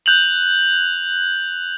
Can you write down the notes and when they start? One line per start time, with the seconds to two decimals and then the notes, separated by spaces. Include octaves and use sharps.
0.06 F#6 G6 F7 F#7